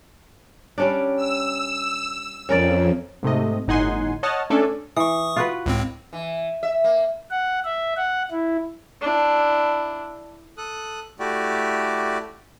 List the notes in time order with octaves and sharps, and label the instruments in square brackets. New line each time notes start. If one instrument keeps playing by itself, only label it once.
[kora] G3 C#4 D4
[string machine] E6
[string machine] F2 [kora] C#4 A#4 D5
[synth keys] G#2 C3 A3 D#5
G1 A2 D#4 F#5 G#5 C6
C#5 D#5 F#5 A5 D#6 F6
A3 C#4 D4 A4 D5 G#5
[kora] E3 [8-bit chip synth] C#6 D#6
[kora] F4 F#4 B4
[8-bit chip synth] C#2 A2 C4
[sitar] E3
E5
A#3
[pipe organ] F#5
E5
F#5
E4
[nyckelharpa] D4 E4
[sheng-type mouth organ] A4 D#6 F#6
A3 E4 F#4 G4 D5